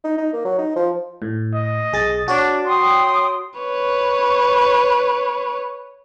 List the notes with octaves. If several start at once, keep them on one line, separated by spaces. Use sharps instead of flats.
D#4
D#4
A#3
F#3
D#4
F3
A2
D#5
B1 G#4 A6
D4 F#4 C#5
G5 C6 D#6
B4 C#5